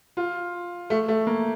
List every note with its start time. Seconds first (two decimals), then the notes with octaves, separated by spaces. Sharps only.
0.17 F4
0.90 A3
1.08 A3
1.27 A#3